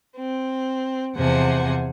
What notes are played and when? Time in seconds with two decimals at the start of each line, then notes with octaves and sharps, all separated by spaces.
0.17 C4
1.16 E2 C3 F3 C5 F#5 G#5